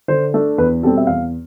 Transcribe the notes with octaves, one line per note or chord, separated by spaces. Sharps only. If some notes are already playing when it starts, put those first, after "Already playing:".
D3 C5
A3 D4
E2 B4
B2 G3 C4 A4
E5
E2 F5